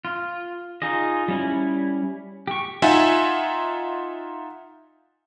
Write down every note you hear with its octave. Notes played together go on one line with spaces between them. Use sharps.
F4
D#4 F4 G#4 D#5
G3 C#4 E4
G4 C#6
D#4 F4 E5 F#5 G#5